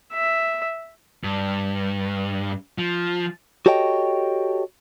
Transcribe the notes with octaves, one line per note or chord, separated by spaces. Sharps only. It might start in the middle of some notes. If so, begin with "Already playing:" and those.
E5
G2
F3
F#4 G4 A4 C#5 D#5 G5